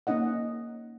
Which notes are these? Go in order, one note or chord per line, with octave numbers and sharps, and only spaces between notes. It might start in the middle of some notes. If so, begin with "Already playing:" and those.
A#3 C#4 D#4 D#5 F#5